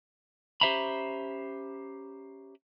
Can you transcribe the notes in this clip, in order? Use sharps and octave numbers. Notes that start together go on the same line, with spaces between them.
C#4 G4 C5 E5 A#5 B5